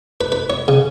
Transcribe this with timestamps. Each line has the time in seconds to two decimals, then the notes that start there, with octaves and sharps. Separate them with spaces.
0.21 B4
0.32 B4
0.50 C#5
0.68 C#3